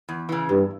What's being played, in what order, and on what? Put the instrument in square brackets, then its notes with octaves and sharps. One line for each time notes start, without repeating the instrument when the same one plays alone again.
[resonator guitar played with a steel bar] E2
C#3 E3
[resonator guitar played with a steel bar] E2 [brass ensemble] G2